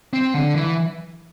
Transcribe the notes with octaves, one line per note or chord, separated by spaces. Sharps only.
C4
D3
E3